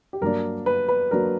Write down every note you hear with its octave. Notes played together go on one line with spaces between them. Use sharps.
G4
G2 F#3 A#3 D4 A#4
B4
B4
F#3 A#3 D4 A#4